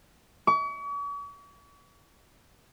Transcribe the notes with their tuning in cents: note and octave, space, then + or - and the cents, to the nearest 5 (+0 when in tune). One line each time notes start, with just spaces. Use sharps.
C#6 +45